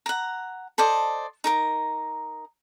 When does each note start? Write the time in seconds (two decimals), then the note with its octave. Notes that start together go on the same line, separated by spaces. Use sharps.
0.06 F#5 A#5
0.78 A4 C5 D5 D#5
1.44 D#4 A#4 A#5